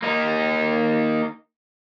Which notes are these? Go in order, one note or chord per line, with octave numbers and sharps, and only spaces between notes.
A#3 D#4